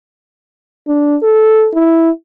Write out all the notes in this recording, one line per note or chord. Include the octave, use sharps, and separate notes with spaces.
D4
A4
E4